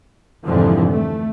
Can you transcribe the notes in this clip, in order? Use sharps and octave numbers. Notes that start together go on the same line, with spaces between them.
C2 F2 G#2 D3 E3 F3
A3